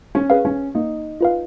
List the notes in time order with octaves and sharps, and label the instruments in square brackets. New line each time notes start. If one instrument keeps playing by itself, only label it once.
[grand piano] C#4
[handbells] G#4 B4 F5
[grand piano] C#4
[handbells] A#3 [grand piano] D#4
[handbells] F4 B4 F5